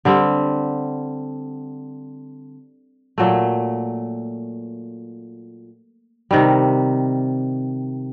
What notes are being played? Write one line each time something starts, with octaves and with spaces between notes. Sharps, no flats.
D3 G3 C4
A#2 F#3 A3
C3 D#3 G3